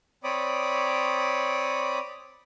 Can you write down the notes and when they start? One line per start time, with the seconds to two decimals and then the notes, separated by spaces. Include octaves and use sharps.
0.24 C4 C#5 D5 B5 D6 D#6